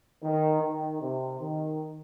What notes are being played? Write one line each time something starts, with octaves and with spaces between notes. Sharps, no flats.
D#3
D#3
C3
D#3